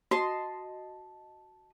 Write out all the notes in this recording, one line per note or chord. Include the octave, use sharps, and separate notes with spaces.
F#4 D#5 A5 C6